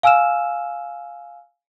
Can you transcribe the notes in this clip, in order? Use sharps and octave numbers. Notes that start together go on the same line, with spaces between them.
F5 G#5 E6 F6 E7